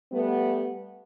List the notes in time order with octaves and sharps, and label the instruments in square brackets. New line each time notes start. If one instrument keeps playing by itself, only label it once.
[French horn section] G3 A3 B3